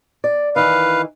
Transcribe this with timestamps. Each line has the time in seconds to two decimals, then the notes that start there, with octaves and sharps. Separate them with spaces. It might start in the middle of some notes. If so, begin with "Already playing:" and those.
0.24 D5
0.56 D#3 E3 B4 F5